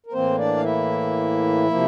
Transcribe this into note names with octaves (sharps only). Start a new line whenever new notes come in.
A#4
A2 E3 A#3 C4 C5
D4 D5
F5
E4 E5
C3 F3 A#3